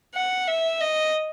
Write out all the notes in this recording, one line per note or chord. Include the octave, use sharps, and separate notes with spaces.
F#5
E5
D#5